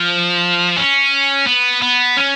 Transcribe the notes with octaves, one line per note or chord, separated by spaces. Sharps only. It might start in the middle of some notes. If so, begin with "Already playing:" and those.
Already playing: F3
C#4
B3
B3
C#4